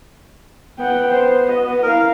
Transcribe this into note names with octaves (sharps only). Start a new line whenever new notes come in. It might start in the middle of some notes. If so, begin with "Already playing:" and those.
B3 F#5 G5
C5
F#4 D#5
E4 A#4 F5